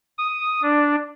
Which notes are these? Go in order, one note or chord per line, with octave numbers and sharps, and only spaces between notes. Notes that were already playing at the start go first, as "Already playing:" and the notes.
D#6
D4